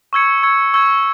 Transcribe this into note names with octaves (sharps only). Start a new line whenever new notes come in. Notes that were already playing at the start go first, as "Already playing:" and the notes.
C#6 E6 G#6 C#7
C#6 E6 G#6 C#7
C#6 E6 G#6